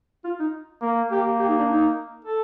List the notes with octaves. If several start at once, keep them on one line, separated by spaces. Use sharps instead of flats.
F4
D#4
A#3
A#3 G4
G4
D#4
D4
D#4
A4